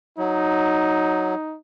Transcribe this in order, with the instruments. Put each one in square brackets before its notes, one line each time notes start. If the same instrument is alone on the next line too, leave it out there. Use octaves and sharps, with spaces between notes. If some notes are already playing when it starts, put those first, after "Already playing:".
[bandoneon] F#3 [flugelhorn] D#4